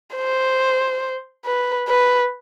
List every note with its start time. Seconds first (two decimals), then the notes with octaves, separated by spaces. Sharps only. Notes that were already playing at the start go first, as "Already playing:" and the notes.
0.16 C5
1.45 B4
1.88 B4